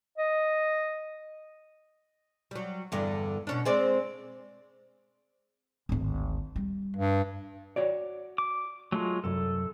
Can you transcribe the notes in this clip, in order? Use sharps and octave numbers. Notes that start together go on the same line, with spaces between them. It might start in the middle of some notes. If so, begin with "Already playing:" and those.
D#5
F#3 G3
E2 G2 D3
B2 C#4 D4
G#3 C4 D5
D1 G#1
G3
G2
F#4 C#5 D5
D6
F#3 G#3 A3 F4
C2 F#2 A4